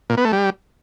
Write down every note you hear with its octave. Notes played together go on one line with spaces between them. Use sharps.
A#2
B3
A3
G3